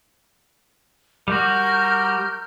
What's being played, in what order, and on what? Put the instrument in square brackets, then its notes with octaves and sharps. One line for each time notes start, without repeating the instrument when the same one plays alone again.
[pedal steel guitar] G3 F#4 [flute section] A#4 F6 G6